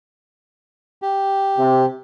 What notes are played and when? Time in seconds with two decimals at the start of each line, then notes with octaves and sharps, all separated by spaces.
1.02 G4
1.59 C3